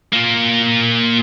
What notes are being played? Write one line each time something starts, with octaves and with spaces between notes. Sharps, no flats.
A#2 A#3